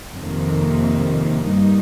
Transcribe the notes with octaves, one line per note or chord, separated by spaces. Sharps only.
F2 C3 D#3 A#3
G2 G3 A#3 D#4